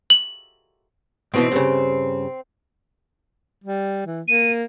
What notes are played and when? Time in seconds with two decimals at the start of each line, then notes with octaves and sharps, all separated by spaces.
0.10 F#7
1.34 G#2 B2 E3 C4
1.52 G2 C#3
3.64 G3
4.07 E3
4.28 A#3 D#7